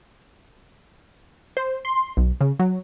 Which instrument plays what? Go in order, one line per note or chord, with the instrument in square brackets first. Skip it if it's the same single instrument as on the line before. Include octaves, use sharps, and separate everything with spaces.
[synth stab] C5
C6
B1
C#3
F#3